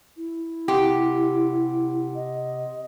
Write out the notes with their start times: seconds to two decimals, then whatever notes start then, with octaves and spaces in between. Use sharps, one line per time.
0.17 E4
0.68 C3 G4 F#5 C6
2.15 D#5